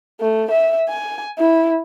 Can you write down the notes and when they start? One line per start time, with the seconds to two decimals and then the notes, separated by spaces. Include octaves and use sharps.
0.20 A3
0.51 E5
0.89 G#5
1.38 E4